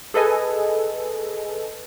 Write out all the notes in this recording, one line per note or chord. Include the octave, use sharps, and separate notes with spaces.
G#4 A4 B4 D#5 G#5